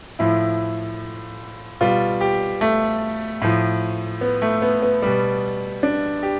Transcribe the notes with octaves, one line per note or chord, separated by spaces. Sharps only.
A2 F3 E4
B2 G3 F4
G4
A3
A2 F3
B3
A3
B3
B3
B2 G3
D4
G4